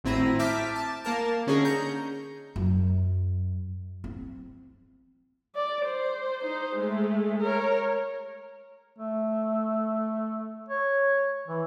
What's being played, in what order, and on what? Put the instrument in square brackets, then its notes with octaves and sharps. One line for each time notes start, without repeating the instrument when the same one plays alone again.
[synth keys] G#1 A2 C4 E4 A#5 D#7
E5 A5 D6 F6 G6 B6
A5
A#3 A#4 A5
D3 C#4 D#4 G#4 A#4
A#5 G6 C#7
[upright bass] F#2
C4
[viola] D5
C5
D#4 C5
G#3 A3
A#4 C#5
[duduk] A3
C#5
E3